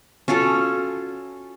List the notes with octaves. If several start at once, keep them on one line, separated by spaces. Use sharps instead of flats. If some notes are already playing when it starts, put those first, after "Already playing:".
C#4 F4 F#4 A4